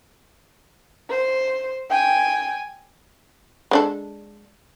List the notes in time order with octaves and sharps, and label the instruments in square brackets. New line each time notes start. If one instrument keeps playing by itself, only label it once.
[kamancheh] C5
G5 G#5
[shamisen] G#3 D4 A4